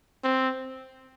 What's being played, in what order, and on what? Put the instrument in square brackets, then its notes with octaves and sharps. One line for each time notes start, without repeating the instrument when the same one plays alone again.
[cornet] C4